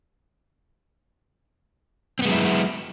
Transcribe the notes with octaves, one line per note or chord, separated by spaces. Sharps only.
F#3 G#3 B3 C4 E4